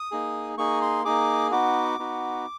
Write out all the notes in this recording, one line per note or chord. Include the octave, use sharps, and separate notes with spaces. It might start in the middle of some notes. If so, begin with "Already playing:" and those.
Already playing: D#6
A#3 D#4 G#4
A#3 D#4 G#4 C#6
C6
A#3 D#4 G#4 D6
B3 D#4 F#4 D6
B3 D#4 F#4